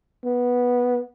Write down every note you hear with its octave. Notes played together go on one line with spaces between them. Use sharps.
B3